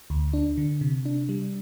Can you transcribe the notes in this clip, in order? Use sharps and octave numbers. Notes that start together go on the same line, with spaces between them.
D2
D4
D3
C3
D4
G3